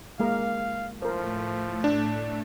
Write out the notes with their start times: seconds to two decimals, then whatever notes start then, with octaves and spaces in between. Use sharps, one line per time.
0.20 G#3 A#3 A#4 F5
1.02 A2 F3 A3 A#4 C5
1.84 D4